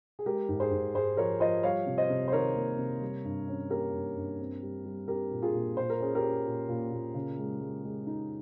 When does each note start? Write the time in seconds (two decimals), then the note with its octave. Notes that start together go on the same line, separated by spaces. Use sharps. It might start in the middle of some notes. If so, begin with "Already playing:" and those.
0.19 G#4
0.26 G#3 G4 A#4
0.49 G#2
0.60 G#4 C5
0.71 G#2
0.95 G#2 G#4 C5
1.17 F3 A#4 C#5
1.40 F3 C5 D#5
1.63 G3 C#5 F5
1.87 C3
1.98 C5 D#5
2.10 C3
2.28 C5
2.32 D#3 A#4 C#5
2.56 A#3
2.78 C3
3.01 G3
3.24 G2
3.48 C#4
3.70 A#3 G4 A#4
3.93 G2
4.16 G2
4.39 C4
4.62 G3
4.85 G3
5.08 C4 G4 A#4
5.31 A#2
5.42 F4 G#4
5.54 A#2
5.77 A#2 C5
5.90 A#4
6.00 C#4 G#4
6.15 G4 A#4
6.23 C#4
6.46 A#2
6.69 A#2
6.92 A#2
7.14 C#3
7.38 G#3
7.61 G#3
7.84 G#3
8.07 D#4